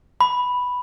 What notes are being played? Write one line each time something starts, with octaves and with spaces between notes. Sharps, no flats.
B5